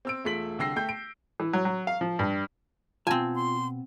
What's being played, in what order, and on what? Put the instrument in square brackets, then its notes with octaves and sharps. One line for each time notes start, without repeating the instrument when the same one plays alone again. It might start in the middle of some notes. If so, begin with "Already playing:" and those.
[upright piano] C4 E6 D7
E1 A3 F4 B6 F#7
C2 D3 G5 E6 A#6 C7
A3 G5 G6
D7
[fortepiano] E3
F#3
F#3
F5
F3
G2
[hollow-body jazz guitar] B2 A5 [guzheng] C4 G#5 [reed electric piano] F4
[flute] C6